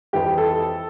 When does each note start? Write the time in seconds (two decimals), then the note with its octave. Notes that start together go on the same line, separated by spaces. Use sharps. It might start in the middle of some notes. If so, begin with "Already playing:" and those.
0.13 F2 E3 G4
0.38 A4